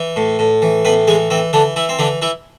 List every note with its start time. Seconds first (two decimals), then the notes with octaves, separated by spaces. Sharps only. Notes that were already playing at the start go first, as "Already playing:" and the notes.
Already playing: E3
0.16 A2
0.39 A2
0.62 E3
0.85 A2 B3 B4
1.07 E3 G#3 G#4
1.30 E3 C4
1.53 D3 E3 D4
1.76 E3 E4
1.89 C4
1.99 D3 E3 D4
2.22 E3 E4